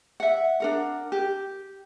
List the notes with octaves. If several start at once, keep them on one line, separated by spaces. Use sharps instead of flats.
E5 F#5
D4 A#4 F#5
G4